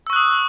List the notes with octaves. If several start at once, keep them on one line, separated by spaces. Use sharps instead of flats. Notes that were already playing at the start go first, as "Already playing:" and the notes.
C#6 D#6 E6 F#6